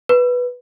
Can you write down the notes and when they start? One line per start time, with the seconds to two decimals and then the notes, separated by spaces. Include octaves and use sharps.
0.09 B4